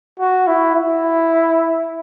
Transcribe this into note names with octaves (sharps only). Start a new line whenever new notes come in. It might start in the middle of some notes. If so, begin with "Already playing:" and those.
F#4
E4
E4